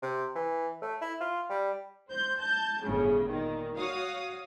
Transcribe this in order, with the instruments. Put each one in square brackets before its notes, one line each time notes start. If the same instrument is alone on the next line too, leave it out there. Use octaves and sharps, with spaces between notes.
[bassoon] C3
E3
A3
E4
F4
G3
[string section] C5 G6
A5 G6
G1 A2 C#3
A#2 D#3
F#4 C#5 F5 D#6